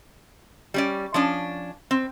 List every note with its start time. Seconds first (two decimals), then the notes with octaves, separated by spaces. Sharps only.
0.74 G3 C#4 D5
1.14 F3 C#4 D4
1.91 C4